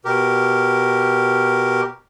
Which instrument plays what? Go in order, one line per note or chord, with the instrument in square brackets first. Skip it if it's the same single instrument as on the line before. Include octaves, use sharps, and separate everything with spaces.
[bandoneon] B2 G4 A#4